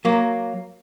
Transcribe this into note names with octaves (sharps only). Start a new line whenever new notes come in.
F#3 A#3